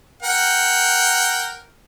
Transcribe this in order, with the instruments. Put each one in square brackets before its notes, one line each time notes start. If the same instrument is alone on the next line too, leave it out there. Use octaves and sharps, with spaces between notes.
[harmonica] A#4 F#5 G5